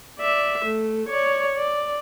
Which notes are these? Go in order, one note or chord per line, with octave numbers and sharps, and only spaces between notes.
D5 E5
A3
C#5 D5
D5